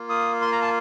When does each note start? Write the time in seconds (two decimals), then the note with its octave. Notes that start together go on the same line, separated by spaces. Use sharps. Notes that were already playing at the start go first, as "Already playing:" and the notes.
Already playing: A#3 F4
0.10 D#6
0.42 C6
0.52 A#5
0.62 A5